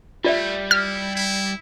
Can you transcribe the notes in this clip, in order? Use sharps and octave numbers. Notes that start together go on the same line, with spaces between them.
G3 A3 F4 D5 E5
E4 F6
E4